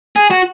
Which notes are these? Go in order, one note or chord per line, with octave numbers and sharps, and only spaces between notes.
G#4
F#4